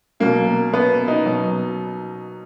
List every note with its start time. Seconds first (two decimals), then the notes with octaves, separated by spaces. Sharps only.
0.20 B2 F#3 A#3
0.74 B3
1.08 D#4
1.26 B2 F#3